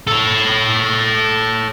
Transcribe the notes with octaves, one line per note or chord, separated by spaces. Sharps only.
A4 C#5